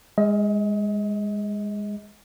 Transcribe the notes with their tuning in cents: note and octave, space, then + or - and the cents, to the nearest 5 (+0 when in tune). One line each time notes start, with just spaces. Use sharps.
G#3 -15 D#5 +35